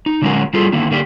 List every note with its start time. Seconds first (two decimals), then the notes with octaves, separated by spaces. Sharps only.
0.06 D#4
0.22 D3 F#3 G#3 C#4 F#4 A#4
0.53 G3 E4 F4 G#4 A4
0.72 D3 D#3 A#3 E4
0.91 D3 A#3 D4 G4